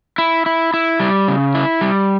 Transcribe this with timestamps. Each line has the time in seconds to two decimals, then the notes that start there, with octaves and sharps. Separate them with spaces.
0.18 E4
0.46 E4
0.74 E4
1.00 G3
1.28 C#3
1.55 E4
1.81 G3